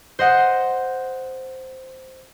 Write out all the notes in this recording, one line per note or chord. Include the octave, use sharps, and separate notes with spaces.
C5 D#5 F#5